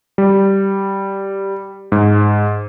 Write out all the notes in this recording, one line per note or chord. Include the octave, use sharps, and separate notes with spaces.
G3
G#2